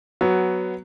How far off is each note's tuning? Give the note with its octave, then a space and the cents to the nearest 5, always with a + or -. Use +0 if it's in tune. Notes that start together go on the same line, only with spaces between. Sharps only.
F#3 +5 B3 +0